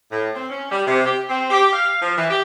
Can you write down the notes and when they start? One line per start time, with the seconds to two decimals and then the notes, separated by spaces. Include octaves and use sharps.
0.11 A2
0.34 C4
0.50 C#4
0.71 G3
0.85 C3
1.05 G4
1.29 C4
1.50 G4
1.72 F5
2.01 F3
2.16 E3
2.29 G4